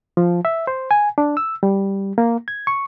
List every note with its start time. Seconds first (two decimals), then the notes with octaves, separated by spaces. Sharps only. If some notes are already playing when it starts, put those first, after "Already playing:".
0.17 F3
0.45 E5
0.67 C5
0.91 G#5
1.18 D4
1.37 E6
1.63 G3
2.18 A#3
2.48 G#6
2.67 C#6